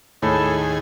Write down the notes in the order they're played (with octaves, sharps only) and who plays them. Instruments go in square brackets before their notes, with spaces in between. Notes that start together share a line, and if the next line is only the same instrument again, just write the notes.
[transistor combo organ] D#2 G#4 [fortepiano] A2 [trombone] A4